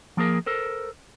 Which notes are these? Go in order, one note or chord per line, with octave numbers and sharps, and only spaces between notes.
F3 A#3 G#4 A#4
A4 A#4 C5